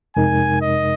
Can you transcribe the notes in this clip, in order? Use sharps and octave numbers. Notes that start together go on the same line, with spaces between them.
F2 C3 G#3 D#4 A#4 G#5
D#5